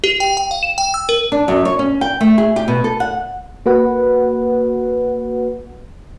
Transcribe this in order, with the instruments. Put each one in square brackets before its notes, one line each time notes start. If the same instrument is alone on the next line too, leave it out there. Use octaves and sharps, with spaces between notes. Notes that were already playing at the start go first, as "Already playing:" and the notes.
[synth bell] G4
G5
G5
F5
E7
G5
E6
A#4
[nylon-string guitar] D4
F#2
C#5
C#4
G5
A3
G#4
G4
B2
A4
F#5
[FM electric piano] A#3 F#4 B4 F#5